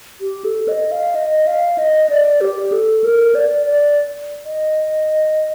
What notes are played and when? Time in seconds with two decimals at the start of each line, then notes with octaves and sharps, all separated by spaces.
0.21 G4
0.45 A4
0.68 D#5
0.92 F5
1.15 D#5
1.47 F5
1.78 D#5
2.10 D5
2.41 G4
2.72 A4
3.04 A#4
3.35 D5
3.67 D5
4.45 D#5